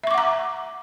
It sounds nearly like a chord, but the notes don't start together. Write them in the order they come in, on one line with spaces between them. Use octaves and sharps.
E5 C#6 D6 F#5 A#5